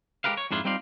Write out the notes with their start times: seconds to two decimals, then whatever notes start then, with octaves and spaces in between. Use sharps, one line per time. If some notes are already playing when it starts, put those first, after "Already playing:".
0.24 G#3 F#4 G4 A#4 B4 F5
0.37 C#5
0.51 F2 G#2 D4 E4 F4
0.65 G3 C4 D#4 F4 D5 F5